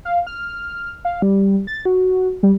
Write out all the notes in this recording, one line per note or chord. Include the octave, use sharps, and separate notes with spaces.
F5
F6
F5
G3
A6
F#4
G3